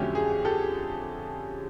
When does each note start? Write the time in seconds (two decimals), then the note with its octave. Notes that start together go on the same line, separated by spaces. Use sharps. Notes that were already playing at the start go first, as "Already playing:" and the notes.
Already playing: F2 D3 F#3 A3 C#4 G4
0.15 G#4
0.45 G4 A4